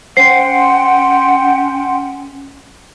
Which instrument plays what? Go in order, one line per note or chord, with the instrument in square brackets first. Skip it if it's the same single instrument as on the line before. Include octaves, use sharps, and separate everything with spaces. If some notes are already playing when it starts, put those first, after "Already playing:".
[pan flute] C#4 [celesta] C5 C7 [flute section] F#5 G5 C6